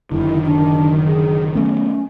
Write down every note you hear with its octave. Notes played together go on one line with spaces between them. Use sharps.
F#1 F#2 D3 D#3 E4
D4
G#4
F#3 A3 B3 C#4